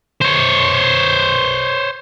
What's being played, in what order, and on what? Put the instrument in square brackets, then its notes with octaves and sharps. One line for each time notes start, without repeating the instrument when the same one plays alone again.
[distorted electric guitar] C5 C#5